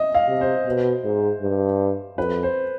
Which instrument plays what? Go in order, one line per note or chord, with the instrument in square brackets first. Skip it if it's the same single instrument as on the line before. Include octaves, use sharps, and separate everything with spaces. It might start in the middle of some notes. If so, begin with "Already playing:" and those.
Already playing: [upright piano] D#5 E5
F5
[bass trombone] C3
[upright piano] C5
[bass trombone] B2
G#2
G2
[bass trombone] F2 [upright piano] B4
[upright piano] C5